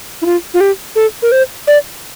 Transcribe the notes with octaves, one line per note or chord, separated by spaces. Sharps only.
E4
F4
F4
G4
A4
A#4
C5
D5